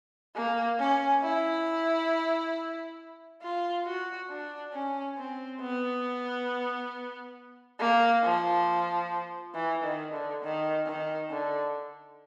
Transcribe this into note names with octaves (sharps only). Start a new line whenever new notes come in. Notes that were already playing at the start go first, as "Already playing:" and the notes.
A#3
C#4
E4
F4
F#4
D4
C#4
C4
B3
A#3
F3
E3
D#3
D3
D#3
D#3
D3